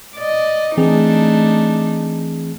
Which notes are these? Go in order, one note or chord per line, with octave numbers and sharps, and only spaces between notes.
D5 D#5
E3 A3 C4 D4 D#4 G#4